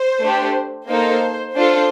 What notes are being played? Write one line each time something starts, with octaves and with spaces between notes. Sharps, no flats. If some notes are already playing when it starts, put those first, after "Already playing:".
Already playing: C5
A3 D4 G4
A#3 D#4 A4 C5
D4 F4 A4 C5